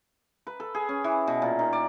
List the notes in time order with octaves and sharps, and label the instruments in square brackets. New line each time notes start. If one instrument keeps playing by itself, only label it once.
[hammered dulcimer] B4
A4
G#4
C#4
E3
B2
A#2
D#3
D5